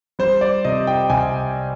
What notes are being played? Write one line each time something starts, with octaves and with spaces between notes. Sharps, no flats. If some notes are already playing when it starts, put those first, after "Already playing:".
G3 C5
D5
C3 D#5
G5
C2 G#5